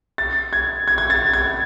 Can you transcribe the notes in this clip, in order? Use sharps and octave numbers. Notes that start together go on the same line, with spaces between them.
A6
G#6
G#6
G#6
A6
G#6